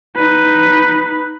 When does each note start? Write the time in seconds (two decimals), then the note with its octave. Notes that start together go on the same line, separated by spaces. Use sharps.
0.16 D#4 B4